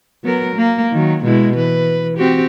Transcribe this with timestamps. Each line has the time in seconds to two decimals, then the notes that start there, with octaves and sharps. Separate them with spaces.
0.23 F#3 B3 A#4
0.56 A#3
0.92 D#3 F#3
1.24 B2 G#3 E4
1.56 E3 B4
2.18 C4 F#4 G4